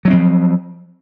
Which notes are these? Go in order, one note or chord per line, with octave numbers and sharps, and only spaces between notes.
F3 F#3 C4 C#4